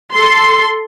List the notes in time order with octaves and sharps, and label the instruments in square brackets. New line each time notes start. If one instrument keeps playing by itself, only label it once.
[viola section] A4 C6